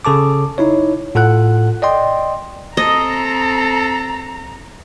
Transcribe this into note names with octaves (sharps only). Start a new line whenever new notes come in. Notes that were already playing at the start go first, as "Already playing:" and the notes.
C#3 A4 A5 D6
D#4 E4 C#5
A2 F4 A4 F#5 F#6
D5 D#5 G5 C6
C4 A4 D#5 A#5